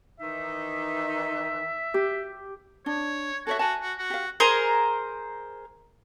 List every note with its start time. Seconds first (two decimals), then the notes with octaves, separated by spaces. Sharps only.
0.20 D#3 E3 D#4 E5
1.94 G4
2.86 D4 C#5
3.47 F#4 A4 C#5 E5
3.59 F#4 G#5 A5
3.81 F#4
3.98 F#4
4.10 G4 F5
4.40 G#4 A#4 C5 A#5